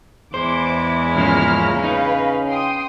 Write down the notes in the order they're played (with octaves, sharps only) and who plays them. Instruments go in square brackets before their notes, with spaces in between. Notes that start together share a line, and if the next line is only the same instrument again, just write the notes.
[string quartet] E2 G#3 E4 [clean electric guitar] C5 [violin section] D6
[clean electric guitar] G#2 F3 A#3 [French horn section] C#3 C#4 [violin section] A#5 F6
[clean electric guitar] D#4 [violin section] B4 F5
[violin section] G5 C6 D#6